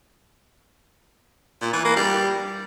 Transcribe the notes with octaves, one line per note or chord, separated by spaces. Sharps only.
A#2
E3
A#3
G3